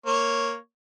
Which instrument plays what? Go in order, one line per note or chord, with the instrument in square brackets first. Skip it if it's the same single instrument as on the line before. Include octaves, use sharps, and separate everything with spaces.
[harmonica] A#3 C#5